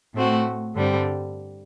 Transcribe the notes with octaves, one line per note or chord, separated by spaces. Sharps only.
A2 A3 C4 F#4
G2 D3 G3 C4